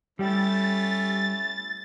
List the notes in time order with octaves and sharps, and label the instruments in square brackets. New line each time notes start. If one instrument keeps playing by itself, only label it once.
[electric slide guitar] G3 G4 [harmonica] A3 C#4 E4 [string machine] A6